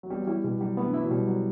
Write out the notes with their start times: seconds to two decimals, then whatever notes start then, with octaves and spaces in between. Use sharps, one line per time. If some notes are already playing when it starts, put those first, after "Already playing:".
0.03 F#3
0.10 G3 B3
0.22 F#3
0.27 G3 E4
0.44 B2 G3
0.61 F#3 G3
0.77 A3 B3
0.86 D3
0.94 E3 E4
1.03 F#3
1.11 B2 G3
1.28 F#3